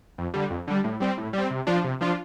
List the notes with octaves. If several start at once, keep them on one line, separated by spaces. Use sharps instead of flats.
F2
D3 G3
F2
D3 G3
A2
G3 C4
A2
G3 C4
C3
F3 D4 F4
C3
F3 D4 F4